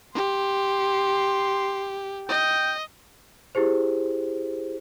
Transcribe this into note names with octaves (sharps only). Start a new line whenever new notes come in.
G4 C6
D#5 G5
E4 G4 G#4 C5